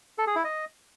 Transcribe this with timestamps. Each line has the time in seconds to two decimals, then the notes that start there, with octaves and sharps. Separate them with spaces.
0.18 A4
0.27 G#4
0.36 E4
0.44 D#5